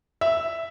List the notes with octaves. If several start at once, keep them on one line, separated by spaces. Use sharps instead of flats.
E5